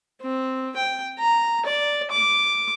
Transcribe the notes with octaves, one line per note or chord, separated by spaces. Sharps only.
C4
G5
A#5
D5
D6